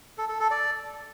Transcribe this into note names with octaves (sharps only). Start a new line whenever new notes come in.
A4
A4
A4
D5